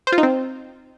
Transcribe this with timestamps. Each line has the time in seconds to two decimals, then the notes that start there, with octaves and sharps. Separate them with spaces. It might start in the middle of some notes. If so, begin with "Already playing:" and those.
0.07 C5
0.12 F4
0.18 D#4
0.23 C4